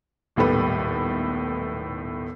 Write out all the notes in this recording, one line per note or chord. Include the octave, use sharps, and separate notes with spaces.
D#1 B1 A2 G3 A4 B4